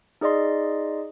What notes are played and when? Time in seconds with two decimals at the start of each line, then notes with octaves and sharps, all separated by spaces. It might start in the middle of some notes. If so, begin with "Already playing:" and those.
0.21 D#4 G#4 D5 D#5 C6